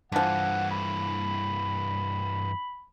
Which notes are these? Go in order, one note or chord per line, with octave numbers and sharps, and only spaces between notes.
G2 D3 E3 F3 F#5
B5